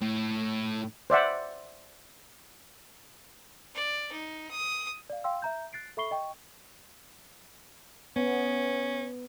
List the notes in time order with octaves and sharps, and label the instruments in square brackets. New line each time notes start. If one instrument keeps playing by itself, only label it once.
[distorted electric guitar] A2
[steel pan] C5 D5 E5 F#5
[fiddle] D5
D#4
D#6
[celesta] D5 F5
F5 G5 C6 E6
E5 A#5 G6
F#6 A6 C7 D7
A4 E5 B5 C#6 C7 G7
D#5 G5 C#6
[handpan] B3 [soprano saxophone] C#4